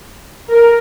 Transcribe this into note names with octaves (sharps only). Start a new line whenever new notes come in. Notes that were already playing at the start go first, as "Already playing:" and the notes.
A#4